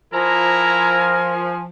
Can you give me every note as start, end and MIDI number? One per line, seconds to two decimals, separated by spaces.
0.13 1.69 53
0.13 1.18 64
0.13 1.53 70
0.13 1.63 80
0.13 1.18 82